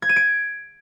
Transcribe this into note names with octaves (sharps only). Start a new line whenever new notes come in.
G#6
D#7
D7